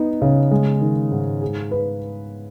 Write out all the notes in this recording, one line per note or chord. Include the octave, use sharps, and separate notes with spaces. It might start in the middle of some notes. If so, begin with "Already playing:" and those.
Already playing: B3 D#4
C#3
G#3
D#3
G#2
G#4
B4